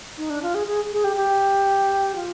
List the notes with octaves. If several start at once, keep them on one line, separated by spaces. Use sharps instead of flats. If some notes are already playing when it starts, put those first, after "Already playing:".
D#4
D4
F4
G#4
G#4
G#4
G4
G4
F4